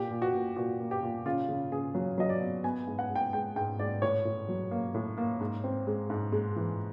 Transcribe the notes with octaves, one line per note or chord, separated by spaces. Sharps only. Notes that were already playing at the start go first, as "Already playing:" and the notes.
Already playing: A#2 G4
A#2
F#4
A#2
A#2 F#4
A#3
G4
A#2
C#3 F4
C#3
C#3 G#4
F#3
F#3 D#5
D5
B3
B3 G#5
G#2
F#5
G#2
G5
G#3 G5
G#2 G5
G#2 D5
A2 C#5
A2
F#3
A#3
A2
A#3
G#2
C4
G#3
G#2
G#3
E3